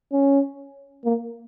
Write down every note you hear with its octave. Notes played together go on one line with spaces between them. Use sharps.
C#4
A#3